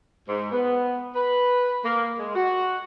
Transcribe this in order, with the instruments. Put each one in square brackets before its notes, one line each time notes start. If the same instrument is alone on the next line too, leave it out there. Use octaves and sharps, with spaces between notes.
[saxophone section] G#2
B3
B4
A#3
G#3
F#4